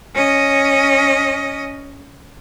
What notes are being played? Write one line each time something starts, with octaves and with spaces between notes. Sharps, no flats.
C#4 D#5